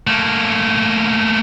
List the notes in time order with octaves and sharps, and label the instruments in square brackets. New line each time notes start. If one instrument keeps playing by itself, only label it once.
[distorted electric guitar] A3 A#3